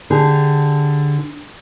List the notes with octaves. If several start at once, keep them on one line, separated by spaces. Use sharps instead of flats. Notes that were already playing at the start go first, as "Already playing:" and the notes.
D3 G4 G#4